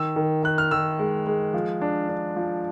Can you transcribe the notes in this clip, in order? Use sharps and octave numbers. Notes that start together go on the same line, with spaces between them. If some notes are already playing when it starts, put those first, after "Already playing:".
Already playing: D#3 E6
D#3
D#3 F#6
F6
D#3 E6
G#3
G#3
F3
D4
D4
F3